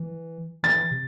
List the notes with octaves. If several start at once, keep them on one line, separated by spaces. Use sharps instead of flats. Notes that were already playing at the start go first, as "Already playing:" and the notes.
Already playing: E3
E3 A6
C3